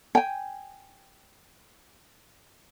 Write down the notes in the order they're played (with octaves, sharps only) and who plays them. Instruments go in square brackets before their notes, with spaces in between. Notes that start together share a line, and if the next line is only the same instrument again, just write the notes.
[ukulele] G5 G#5